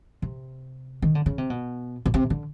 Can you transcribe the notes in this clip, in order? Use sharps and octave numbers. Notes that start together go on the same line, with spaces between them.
C3
D#3
D3
C#3
C3
B2
B2
C3
D3